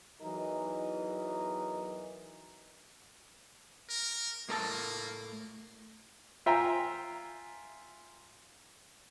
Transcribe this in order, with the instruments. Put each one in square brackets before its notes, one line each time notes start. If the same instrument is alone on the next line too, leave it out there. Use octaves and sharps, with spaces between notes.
[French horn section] E2 E3 F#3 D#4 A#4 D#5
[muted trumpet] A#4
[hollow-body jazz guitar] A2 A#4 A5 [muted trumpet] A#3
[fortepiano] F4 E5 G5 G#5 A#5